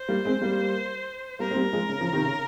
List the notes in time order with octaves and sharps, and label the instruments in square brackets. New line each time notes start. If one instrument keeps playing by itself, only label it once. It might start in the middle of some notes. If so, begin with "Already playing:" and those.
Already playing: [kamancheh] C5
[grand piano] G3 A#3
G#3 C4
G3 A#3
[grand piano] G3 A#3 [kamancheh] A#4
[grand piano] C4
G3 A#3
F3 G#3
C#3
C#3 F3
C3 D#3
C#3